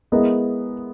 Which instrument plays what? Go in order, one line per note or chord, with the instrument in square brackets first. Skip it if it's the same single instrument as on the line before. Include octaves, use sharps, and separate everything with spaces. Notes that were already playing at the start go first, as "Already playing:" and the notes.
[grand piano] G#3 B3 E4 A#4 D#5